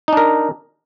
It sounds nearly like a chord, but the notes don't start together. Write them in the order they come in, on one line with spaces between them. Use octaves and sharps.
D#4 D4 A#4